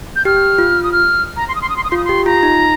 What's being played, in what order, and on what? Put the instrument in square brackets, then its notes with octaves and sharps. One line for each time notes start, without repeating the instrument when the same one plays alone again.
[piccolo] G6
[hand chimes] G4 [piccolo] F6
[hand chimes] F4
[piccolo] D#6
F6
A#5
C6
D#6
C6
D#6
C6
D#6
[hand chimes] F4 [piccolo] C6
[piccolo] D#6
[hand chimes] G4 [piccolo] C6
[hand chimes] F4 [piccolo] A#5
[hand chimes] D#4